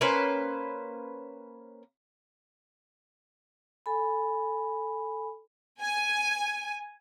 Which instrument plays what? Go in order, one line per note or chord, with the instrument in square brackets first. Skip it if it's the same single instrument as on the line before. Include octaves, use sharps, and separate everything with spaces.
[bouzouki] A#3 C#4 B4 C5
[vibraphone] A4 G#5 B5
[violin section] G#5